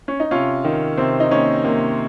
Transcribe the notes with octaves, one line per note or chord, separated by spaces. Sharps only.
C#4
D#4
C3 C#4 F4
D#3
C3 C4
D#4
D#3 A#3 C#4
C3 A#3